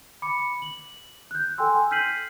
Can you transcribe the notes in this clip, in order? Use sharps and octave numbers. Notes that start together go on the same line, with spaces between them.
B5 D6 C#7
F#7
F#6 G6
A4 G5 G#5 C6 E6
F6 G6 B6 C7 D#7 F#7